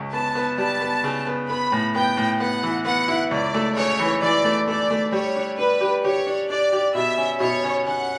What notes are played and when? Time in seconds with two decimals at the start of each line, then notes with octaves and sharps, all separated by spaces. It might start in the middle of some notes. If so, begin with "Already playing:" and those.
Already playing: C#2 C#3
0.12 B3 A5
0.35 B3
0.58 G3 A5
0.81 B3
1.04 C#3
1.27 B3
1.49 B3 B5
1.72 A2
1.94 B3 G5
2.17 A2
2.40 B3 F#5
2.63 E3
2.85 B3 F#5
3.08 E4
3.31 C#2 D5
3.54 A3
3.76 C#3 C#5
3.99 E3
4.22 E3 D5
4.44 A3
4.67 A3 D5
4.91 A3
5.12 G3 C#5
5.36 D4
5.58 D4 B4
5.81 G4
6.04 G4 C#5
6.27 D4
6.50 D4 D5
6.73 G4
6.95 B2 E5
7.17 C#4
7.40 B2 C#5
7.64 C#4
7.86 C#4 F#5